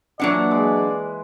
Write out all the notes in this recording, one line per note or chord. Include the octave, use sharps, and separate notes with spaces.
A#2 E3 F#3 D4 D5 F#5
G#3